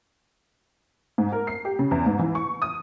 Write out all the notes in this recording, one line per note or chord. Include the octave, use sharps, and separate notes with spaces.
G#2
A#4
C7
G4
C#3
E2
G#2
E3
C#6
D#6